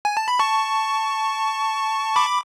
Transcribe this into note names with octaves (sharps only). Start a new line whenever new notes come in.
G#5
A5
B5
A5 C#6
B5 D6